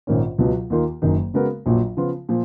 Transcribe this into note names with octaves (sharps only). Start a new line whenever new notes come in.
A#1 G#2 D#3 A#3 C#4
C#2 B2 F#3
D#2 D#3 A#3 F4
F#1 F#2 D#3
C#3 G#3 B3 F#4 A#4
A#1 A#2 F#3
C#3 F3 B3 F4
A#2 F3